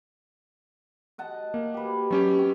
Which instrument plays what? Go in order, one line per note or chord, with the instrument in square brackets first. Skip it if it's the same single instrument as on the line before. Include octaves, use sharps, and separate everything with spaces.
[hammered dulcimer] D#5 F#5 A5
[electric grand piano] A#3
[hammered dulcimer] G4 B4
[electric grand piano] F#3 C#4 G4 [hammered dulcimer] C#6
[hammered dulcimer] C4